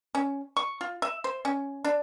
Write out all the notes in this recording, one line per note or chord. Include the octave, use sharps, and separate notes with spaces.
C#4
C#6
F4
E5
C5
C#4
D4